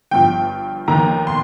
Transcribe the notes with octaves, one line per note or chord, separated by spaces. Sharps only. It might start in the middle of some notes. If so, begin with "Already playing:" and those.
G1 G2 F3 G5
F1 D#2 D#3 A#3 A#5
C6